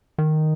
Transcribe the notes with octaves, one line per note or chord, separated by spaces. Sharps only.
D#3